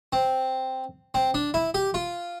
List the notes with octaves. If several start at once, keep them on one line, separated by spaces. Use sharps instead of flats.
C4
C4
D4
E4
G4
F4